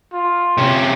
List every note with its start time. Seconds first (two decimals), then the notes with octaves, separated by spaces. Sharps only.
0.13 F4
0.58 C3 C#4